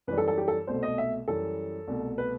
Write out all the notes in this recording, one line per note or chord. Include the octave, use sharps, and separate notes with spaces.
F#2 E3 G3 B4
A4
A4
G4
A4
C2 B2 A3 C5
D#5
E5
F#2 E3 G3 A4
C2 B2 A3
B4